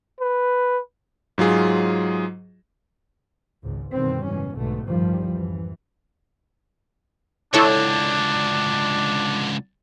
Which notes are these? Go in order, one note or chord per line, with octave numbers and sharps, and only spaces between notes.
B4
G#2 F#3 F4 G#4
G#1 C#2 G#2
F#2 B2 D3 D#3 G3 C4
F#1 G#2 B2 E3 C#4
B1 G#2 B2 D3 A3
A1 D2 G2 D#3 F3 G3
F#2 E3
C#2 D3 D4 E4 A4 C#5